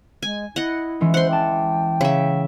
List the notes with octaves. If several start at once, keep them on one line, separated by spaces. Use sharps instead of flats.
G#3 G#5
E4 D#5 F#5
E3 G#3 C#4
C5 F#5 C6
G5 A5 D6
C#3 E5